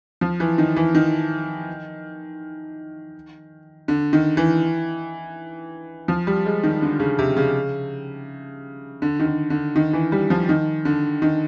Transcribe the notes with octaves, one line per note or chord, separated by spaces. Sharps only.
F3
E3
D#3
E3
D#3
D3
D#3
E3
F3
G3
G#3
D#3
D3
C#3
C3
C#3
D3
D#3
D3
D3
D#3
E3
G3
F3
D#3
D3
D#3